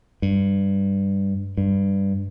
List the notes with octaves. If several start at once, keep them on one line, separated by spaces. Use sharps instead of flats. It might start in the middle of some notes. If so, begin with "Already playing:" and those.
G2
G2